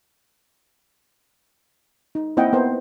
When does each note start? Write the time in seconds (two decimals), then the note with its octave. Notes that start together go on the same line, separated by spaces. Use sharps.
2.15 D#4
2.37 A#3 C4 E4 D#5 F#5 G5
2.53 B3 A#4 C5